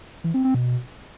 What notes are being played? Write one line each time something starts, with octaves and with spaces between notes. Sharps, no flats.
E3
C4
C4
B2